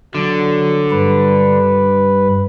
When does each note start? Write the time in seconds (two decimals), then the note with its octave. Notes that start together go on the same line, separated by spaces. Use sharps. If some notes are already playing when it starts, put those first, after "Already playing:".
0.15 D3 F#3
0.91 G2 B4